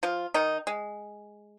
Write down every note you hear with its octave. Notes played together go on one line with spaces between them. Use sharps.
F3 F4
D#3 D#4
G#3